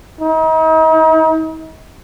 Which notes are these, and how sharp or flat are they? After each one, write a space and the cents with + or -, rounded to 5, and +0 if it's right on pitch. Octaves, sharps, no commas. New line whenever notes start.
D#4 +40